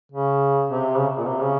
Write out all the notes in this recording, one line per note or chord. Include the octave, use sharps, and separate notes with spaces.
C#3
C3
C#3
A#2
C3
C#3